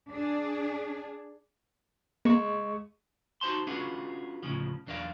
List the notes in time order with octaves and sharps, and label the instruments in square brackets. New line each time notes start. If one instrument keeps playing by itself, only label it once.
[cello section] D4 G#4
[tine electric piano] G#3 C#6 [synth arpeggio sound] A#3
[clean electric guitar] D#4 F#4 C5 A5 C6
C#4 D4 F4 F#4 G#4 B4
D2 A2 C#3 F3
B1 E2 D4 A#4 D5 F5